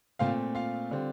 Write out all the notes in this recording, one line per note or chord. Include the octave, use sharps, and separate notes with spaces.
A#2 A3 C4 F4 F5
F4 F5
D3 G3 C4